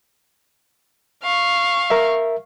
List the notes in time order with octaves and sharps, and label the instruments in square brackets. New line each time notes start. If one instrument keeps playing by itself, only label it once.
[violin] F5 C#6
[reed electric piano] A#4 E5